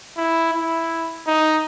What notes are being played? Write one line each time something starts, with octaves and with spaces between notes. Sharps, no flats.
E4
E4
D#4